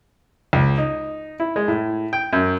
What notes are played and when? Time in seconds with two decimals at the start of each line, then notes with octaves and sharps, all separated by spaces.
0.53 C#2
0.78 D#4
1.40 E4
1.56 G#3
1.68 A2
2.13 G5
2.33 F#2